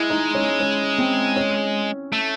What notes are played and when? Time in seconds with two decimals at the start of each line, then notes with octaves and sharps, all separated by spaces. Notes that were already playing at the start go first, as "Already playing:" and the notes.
Already playing: G#3 E4
0.10 D#4
0.35 C#4
0.60 C#4
0.98 C4
1.36 C#4
2.13 A3